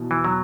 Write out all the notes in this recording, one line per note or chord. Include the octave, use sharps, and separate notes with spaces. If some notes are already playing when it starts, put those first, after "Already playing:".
Already playing: E2 B2
E3
F#3